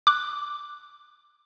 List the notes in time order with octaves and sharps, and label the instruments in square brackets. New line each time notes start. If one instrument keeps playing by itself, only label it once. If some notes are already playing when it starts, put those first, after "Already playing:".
[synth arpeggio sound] D6 F#6